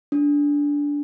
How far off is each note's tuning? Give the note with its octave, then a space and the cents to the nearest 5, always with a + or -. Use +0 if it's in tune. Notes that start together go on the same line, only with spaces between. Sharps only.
D4 -15